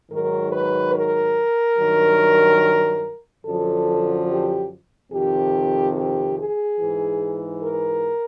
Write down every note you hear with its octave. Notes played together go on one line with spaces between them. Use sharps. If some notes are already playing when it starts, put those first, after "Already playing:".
G#2 D#3 F#3 A#4
B4
A#4
G2 D#3 F#3
F#2 D3 F3 A4
G4
F2 C3 D#3 G4
G4
G#4
G#2 E3
A#4